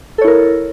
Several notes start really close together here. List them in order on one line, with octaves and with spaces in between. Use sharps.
A4 C#5 E4 A#4